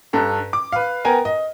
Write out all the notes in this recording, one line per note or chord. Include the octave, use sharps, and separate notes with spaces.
G2 A4 A#5
D6
B4 F5
B3 A#4 G5 G#5 A#5
D#5